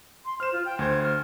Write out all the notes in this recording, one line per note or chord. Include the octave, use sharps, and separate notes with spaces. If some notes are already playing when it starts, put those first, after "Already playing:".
C6
C5 F6 E7
F4
G5
D2 C5 G#6
F6